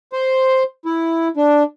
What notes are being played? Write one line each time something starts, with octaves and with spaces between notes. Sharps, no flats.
C5
E4
D4